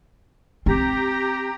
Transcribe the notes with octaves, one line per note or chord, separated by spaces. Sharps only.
C4 G4 A#5